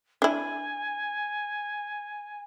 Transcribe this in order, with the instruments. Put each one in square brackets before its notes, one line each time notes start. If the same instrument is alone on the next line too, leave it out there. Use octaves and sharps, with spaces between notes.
[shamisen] D4 E4 [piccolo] G#5